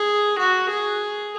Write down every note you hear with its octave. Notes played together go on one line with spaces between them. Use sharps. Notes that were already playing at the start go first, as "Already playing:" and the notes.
Already playing: G#4
F#4
G#4